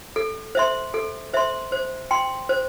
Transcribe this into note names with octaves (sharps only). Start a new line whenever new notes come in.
A4
C5 E5 C6
A4
C5 E5 C6
C5
G5 C6
C5